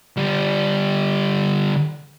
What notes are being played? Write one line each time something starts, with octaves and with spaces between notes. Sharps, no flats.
D3 G3